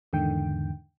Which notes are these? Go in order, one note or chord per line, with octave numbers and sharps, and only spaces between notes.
E2 G#2 D3 D#3 G5